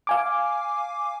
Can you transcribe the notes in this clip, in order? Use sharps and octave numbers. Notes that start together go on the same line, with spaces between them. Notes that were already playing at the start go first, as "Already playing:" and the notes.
F5 G#5 D6